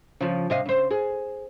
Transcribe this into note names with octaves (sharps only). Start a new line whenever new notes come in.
C#3 F3
C3 D#5 F5
C#3 C5
G#4